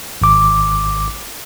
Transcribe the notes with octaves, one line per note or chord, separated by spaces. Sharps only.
G#1 D6